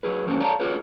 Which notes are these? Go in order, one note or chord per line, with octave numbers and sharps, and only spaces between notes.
F#3 G#4 B4
E2 G2 A#3 C4 C#4 F#4
A4 C#5 D5 F5 A5 A#5
F4 F#4 G#4 B4 C#5